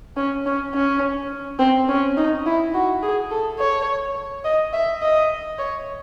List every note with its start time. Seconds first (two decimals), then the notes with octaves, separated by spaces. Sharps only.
0.17 C#4
0.46 C#4
0.74 C#4
1.59 C4
1.89 C#4
2.17 D#4
2.46 E4
2.74 F#4
3.02 G#4
3.31 A4
3.59 C#5
4.45 D#5
4.73 E5
5.02 D#5
5.58 C#5